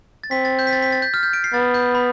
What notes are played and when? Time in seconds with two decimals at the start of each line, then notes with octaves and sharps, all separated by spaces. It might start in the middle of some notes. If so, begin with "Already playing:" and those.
0.24 A6
0.31 C4 B6
0.45 A6
0.59 G6
0.67 B6
0.73 A6
0.82 B6
0.92 A6
1.02 G6
1.14 F6
1.23 G6
1.33 D7
1.44 C7
1.54 B3 A6
1.74 G6
1.95 B5